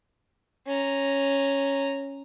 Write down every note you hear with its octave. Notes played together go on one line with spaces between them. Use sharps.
C#4 A#5